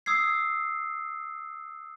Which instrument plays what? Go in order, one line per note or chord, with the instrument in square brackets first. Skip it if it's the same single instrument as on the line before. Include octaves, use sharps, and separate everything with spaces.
[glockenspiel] D#6 E6 G#6 C7